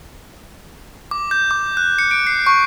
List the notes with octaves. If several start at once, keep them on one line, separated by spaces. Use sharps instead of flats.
D6
G6
D6
F#6
C#7
D7
C7
C#6